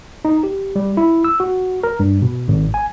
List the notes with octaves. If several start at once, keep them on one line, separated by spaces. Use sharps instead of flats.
D#4
G4
G3
E4
E6
F#4
A#4
G2
B2
G#1
G#5